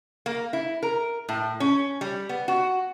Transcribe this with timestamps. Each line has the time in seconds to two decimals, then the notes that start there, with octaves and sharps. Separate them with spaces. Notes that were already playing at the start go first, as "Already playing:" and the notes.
0.26 A#3
0.53 E4
0.83 A#4
1.29 A2
1.60 C#4
2.01 G3
2.29 B3
2.48 F#4